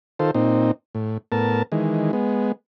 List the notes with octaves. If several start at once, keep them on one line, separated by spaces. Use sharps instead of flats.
D#3 F4 A4 C5
A#2 C4 D#4
A2
A2 B3 A#4 A5
D#3 E3 G#3
G#3 B3